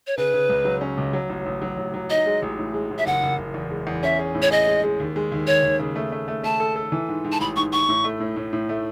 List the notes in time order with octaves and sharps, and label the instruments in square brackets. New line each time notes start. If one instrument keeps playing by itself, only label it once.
[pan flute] C#5
[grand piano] C#3 [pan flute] B4
[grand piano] C#3
C#2
F#3
C#4
C#2
F#3
A1
A1
F#3
A1
F#3
[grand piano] D#4 [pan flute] D#5
[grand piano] G#3
A1
A2
G#3
A1
[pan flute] E5
[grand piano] F#1 [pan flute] F#5
[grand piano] F#1
F#1
E2
G#3
E2
[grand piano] C#4 [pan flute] E5
[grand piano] G#4
A2
[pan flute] C#5
[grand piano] G#4 [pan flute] D#5
[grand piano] G#3
G#3
D#2
G#3
D#2
[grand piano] D#2 [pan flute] C#5
[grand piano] D#2
C#3
A3
A3
A3
[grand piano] A3 [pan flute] A5
[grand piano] A4
A4
E3
G#2
G#2
[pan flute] A5
[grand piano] A1 [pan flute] B5
[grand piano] G#2 [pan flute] C#6
[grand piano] G#2 [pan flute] C#6
[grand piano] A2
A3
A2
A2
A2
A3